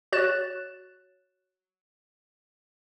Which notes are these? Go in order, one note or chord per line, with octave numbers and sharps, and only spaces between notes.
F#4 C#5 F#6 A6 E7